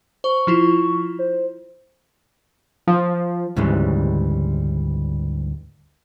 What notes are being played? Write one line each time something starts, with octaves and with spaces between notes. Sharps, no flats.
C5 C#6
F3 E4 F4
C5
F3
D2 G#2 C#3 E3 G3 G#3